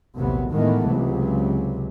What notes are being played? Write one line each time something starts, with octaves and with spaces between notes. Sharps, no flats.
A#1 D#2 A2 C3 F#3 B3
A2 D#3 E3 G#3 A3 B3
C#2 C3 F#3